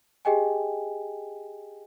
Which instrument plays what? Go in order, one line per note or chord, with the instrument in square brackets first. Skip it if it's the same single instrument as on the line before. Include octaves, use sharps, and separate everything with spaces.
[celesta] G4 G#4 D#5 G5 G#5